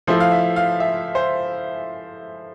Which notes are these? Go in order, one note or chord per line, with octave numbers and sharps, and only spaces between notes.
F3 A3 E4 C5
F5
E5
F5
E5
C5